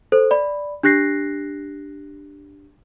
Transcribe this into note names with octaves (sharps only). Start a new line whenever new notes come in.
A4 C5
D5 B5
D4 G4 F#6 A#6 C7